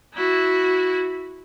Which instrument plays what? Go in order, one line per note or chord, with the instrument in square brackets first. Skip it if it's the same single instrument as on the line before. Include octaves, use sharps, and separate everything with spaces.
[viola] E4 F#4